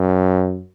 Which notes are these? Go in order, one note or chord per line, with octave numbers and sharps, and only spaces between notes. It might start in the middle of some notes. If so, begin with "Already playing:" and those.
Already playing: F#2